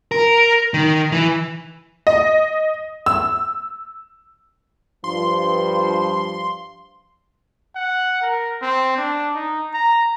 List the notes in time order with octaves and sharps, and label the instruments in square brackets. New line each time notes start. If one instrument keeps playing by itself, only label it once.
[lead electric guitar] A#4
D#3
E3
[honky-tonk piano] D#5
E6
[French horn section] G2 F3 [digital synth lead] C6
[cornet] F#5
A#4
C4
D4
D#4
A#5